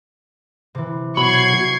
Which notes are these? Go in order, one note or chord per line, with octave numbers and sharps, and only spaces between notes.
C3 E3
B2 F#3 F#4 B5 C#6 G#6 C7